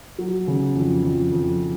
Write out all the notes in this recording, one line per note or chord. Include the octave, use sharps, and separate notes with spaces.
F#3
C#3
F2
F2
F2